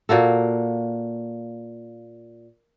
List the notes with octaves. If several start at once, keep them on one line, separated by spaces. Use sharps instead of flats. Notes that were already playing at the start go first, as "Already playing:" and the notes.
A#2 A#3 F#4 A4